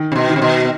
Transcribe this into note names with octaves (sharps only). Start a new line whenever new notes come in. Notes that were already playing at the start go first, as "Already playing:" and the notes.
Already playing: D#3
C3
B2
D#3
C3
B2